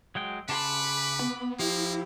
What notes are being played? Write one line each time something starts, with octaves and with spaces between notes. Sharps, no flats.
F#3 G#3 G5
C#3 B4 A5 B5 C6 D6
B3
F3 A#3 E4 G4